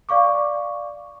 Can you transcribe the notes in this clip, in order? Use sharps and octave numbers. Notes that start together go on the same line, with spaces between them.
D5 F5 C#6 D6